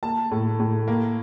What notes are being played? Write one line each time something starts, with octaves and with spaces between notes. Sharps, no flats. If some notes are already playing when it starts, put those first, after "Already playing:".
A#3 A5
A2
A2
A#3